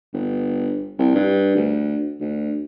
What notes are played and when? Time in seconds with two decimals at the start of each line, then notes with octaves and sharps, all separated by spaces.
0.14 G1
0.99 C2
1.15 G2
1.56 D2
2.20 D2